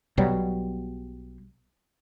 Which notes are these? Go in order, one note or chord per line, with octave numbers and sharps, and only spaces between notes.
B1 B2 F#3 G3